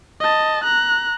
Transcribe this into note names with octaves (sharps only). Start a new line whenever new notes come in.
D#5 A5
A#5 F#6